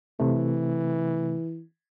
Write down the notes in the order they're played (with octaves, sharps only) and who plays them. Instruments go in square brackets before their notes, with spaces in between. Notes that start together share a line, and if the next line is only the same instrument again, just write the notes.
[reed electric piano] C3 A3 [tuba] E3